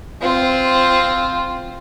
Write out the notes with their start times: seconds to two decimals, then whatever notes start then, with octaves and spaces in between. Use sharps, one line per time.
0.21 C4 F4